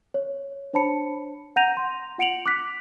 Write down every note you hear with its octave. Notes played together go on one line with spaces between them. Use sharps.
C#5
D4 C5 C#5 A5 B5 C#7
F#5 A#5 G6 A#6 D#7 F7
C6
F4 F#5 C#7 D7 F7 F#7
D6 F#6 B6